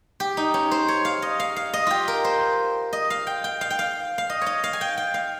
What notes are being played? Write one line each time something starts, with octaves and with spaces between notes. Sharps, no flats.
G4
D#4
C#4
C5
C#5
F5
D#5
F5
F5
D#5
F4 G4
A#4
C5
D#5
F5
G5
G5
F5
G5
F5
F5
D#5
C#5 D#5
F5
G#5
G5
G5
F5